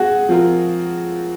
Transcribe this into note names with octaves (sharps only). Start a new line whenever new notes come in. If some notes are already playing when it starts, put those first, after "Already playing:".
Already playing: G#3 C4 F#4 G#4
F3 C4 F4 A#4